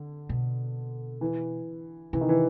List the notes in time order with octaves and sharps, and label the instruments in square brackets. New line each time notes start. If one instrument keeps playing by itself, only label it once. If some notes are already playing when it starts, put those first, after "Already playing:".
Already playing: [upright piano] D3
[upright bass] B2
[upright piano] E3
[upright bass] C3 [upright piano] E3
[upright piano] D#3
E3